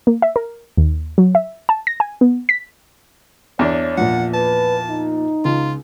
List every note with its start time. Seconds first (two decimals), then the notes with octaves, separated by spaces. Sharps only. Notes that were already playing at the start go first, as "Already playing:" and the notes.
0.07 A#3
0.22 E5
0.36 A#4
0.77 D#2
1.18 F#3
1.35 E5
1.69 A5
1.87 A#6
2.00 G#5
2.21 B3
2.49 B6
3.59 E2 D4 C#5
3.97 A#2 F3 F#5
4.34 B4 A5
4.90 D#4
5.45 C#2 F4